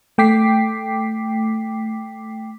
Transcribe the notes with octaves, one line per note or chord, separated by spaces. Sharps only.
A3 G5 D6 B6 C7